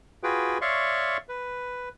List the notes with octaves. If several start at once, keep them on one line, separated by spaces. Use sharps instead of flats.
F4 F#4 G#4 B4 G5
C#5 D5 E5 F5 C6 C#6
B4